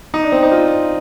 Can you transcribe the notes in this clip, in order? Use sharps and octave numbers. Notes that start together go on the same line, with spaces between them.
D#4
D4
C4
D#4
F4